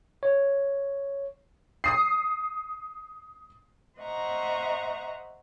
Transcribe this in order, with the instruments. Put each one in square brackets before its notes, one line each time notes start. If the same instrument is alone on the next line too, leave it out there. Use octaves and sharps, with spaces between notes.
[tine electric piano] C#5
[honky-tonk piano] D#6 C7
[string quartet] C5 D#5 E5 F#5 A#5 C#6